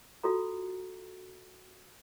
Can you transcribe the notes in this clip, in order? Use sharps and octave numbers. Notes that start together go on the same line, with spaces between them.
F4 F#4 A4 A#5